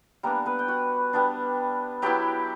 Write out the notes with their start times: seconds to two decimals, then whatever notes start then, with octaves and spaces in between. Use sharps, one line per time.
0.23 G3 A#3 B3 D4 A#4
0.46 B3 B4
0.59 G5
0.68 F#4 F#5
1.13 G3 B3 D4
2.02 F#3 B3 E4 G4 G5